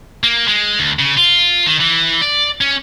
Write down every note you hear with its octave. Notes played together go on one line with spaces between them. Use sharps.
A#3
G#3
D2
C#3
F4
D#3
E3
D5
C#4